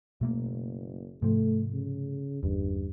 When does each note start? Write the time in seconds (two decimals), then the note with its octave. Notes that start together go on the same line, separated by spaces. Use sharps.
0.21 F#1 B2 A3 A#3
1.22 G#2 C3 F3 A3
1.73 C#3
2.43 G1 E2 G2